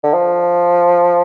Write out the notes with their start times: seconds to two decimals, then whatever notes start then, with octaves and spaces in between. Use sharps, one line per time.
0.04 D3
0.14 F3